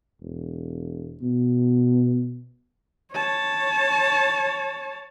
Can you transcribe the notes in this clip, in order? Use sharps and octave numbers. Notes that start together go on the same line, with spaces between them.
E1
B2
C#5 A5